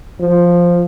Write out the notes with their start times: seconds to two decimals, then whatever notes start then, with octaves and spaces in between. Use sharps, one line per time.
0.20 F3